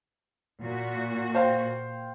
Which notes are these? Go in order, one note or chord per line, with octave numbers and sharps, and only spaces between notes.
A#2 F#4
C5 F5 G5